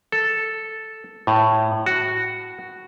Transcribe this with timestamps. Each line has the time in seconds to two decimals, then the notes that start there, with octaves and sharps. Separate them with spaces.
0.12 A4
1.27 A2
1.86 F#4